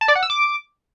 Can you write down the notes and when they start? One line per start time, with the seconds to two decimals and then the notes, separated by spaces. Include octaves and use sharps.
0.01 A5
0.08 D5
0.15 F#5
0.23 E6
0.30 D6